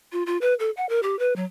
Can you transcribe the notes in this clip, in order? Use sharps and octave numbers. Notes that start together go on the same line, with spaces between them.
F4
F4
B4
A4
F#5
A#4
G4
B4
F#3